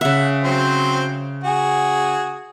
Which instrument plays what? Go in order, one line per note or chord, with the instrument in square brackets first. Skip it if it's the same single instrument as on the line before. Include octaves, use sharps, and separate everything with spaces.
[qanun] C#3 E5 [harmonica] F#5
[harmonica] F#3 C4 C5
F#4 G#4